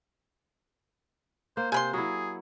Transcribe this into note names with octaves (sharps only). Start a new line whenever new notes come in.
A#3 C5
C3 C5 G#5 B5 C6
F#3 E4 G#4